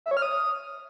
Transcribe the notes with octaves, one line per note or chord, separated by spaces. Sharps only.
E5
C#5
F6
D#6